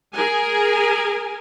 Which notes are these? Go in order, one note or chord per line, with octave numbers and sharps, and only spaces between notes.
G#4 A#4 G#5